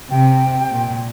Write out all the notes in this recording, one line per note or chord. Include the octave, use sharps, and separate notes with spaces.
C3 G5
A#2